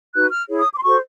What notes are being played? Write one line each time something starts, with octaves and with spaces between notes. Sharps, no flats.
D#4 F#4 B4 F#6
F6
E4 G#4 C#5
D#6
D6
C6
F#4 A4 C5 C#6